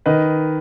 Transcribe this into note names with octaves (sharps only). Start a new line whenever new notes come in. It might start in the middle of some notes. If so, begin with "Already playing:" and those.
D#3 B4 D#5